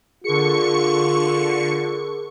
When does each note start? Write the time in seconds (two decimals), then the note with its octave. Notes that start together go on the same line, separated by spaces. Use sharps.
0.24 D3 F4 G#4 A#4 C#6 C#7